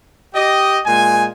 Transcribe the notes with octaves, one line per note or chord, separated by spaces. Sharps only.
G4 D#5
A#2 G#3 G#5